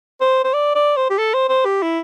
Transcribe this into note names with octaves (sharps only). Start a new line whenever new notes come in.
C5
C5
D5
D5
C5
G4
A4
C5
C5
G4
E4